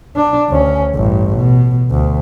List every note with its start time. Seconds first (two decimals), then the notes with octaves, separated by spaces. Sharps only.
0.16 D4
0.50 D2 C#4
0.95 A1 G2
1.35 B2
1.91 D2